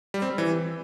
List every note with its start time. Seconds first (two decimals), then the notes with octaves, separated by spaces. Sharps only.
0.14 G3
0.22 C4
0.30 G3
0.38 E3